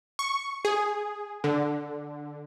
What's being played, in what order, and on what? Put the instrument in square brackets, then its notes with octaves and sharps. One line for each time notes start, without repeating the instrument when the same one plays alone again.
[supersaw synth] C#6
G#4
D3